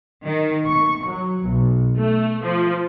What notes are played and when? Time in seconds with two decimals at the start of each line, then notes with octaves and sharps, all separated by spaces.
0.25 D#3
0.67 C#6
1.06 F#3
1.48 B1
1.97 A3
2.42 F3